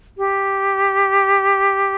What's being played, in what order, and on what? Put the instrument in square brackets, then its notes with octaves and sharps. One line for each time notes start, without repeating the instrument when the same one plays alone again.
[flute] G4